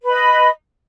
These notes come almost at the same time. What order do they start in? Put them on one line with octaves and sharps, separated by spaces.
B4 B5 D#5